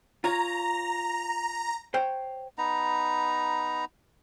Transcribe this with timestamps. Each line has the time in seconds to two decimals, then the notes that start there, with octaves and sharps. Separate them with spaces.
0.24 F4 C#5 A#5
1.94 C5 C#5 G5
2.58 B3 D#4 A#5